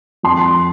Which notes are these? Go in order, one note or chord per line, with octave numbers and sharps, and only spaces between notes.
F2 C6